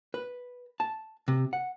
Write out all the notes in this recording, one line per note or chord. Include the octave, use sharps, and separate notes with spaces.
B4
A5
C3
F#5